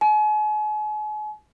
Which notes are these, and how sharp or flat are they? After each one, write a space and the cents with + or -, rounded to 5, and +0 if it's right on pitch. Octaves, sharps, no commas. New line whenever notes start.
G#5 +40